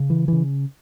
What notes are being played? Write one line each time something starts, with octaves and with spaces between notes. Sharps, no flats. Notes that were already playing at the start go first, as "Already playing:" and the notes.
Already playing: C#3
E3
C#3 E3